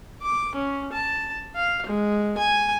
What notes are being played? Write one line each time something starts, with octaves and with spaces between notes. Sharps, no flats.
D6
C#4
A5
F5
G#3
G#5